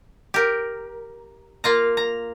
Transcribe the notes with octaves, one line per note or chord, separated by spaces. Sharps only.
G4 A#4
A#3 F4 A#5
A#5